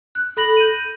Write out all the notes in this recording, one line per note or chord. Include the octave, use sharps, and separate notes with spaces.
F#6
A4 B5 A#6 F#7
G6 D#7